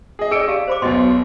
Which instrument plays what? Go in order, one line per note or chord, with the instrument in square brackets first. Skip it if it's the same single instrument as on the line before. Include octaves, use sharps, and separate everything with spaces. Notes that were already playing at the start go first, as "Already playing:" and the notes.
[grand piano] G#4 D#5
[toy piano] G#4 D5 [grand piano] E6 C#7 D7
[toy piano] G4 F5 A5
C5 B5 D6
[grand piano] B1 B2 [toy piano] D#5 C6